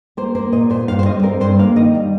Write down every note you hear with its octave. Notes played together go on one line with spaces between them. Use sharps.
A#3 C5
A#3 C5
A#2 D#5
A#2 C5
G2 F5
C5
G3 D#5
C4 A#4
G2 C5
A#3 F5
D#3 D#5
G3